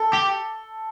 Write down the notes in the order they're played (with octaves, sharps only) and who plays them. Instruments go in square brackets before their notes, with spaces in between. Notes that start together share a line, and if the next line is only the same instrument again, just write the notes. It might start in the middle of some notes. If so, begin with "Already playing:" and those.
Already playing: [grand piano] A4
[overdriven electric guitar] G4